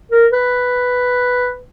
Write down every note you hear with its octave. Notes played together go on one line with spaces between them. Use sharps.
A#4
B4